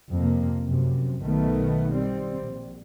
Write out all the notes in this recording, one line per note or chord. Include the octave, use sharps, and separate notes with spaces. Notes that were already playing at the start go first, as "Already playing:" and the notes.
F2 C3 A#3
F#2 C3
B1 D#3 A3 B3
G3 C4
A#1